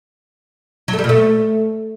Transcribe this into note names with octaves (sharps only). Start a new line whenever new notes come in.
F#3
A3
G3
A#2
A3